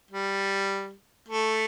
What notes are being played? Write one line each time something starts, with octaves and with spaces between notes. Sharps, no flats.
G3
A3